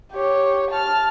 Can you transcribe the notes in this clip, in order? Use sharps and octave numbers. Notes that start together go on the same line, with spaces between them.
G4 C#5
A5 F6